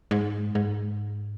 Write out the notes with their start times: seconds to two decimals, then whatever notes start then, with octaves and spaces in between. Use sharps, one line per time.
0.11 G#2
0.55 G#2